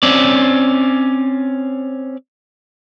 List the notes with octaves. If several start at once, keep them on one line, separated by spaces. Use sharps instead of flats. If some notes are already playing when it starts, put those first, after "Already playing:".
C4 C#4 D5